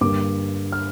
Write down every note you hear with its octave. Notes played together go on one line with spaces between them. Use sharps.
G2 D3 G3 A#3 D6
F6